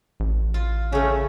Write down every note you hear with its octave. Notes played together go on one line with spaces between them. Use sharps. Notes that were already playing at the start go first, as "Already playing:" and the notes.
A1
F4
C#3 A3 C#4